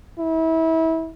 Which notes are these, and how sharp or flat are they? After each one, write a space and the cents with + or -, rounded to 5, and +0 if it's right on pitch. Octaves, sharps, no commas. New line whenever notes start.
E4 -30